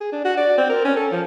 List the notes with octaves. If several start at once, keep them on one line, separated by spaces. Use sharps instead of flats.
G#4
D4
F#4
D5
C4
A#4
C#4
A4
F3